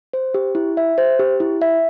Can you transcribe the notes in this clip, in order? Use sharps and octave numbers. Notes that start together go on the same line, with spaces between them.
C5
G4
E4
E5
C5
G4
E4
E5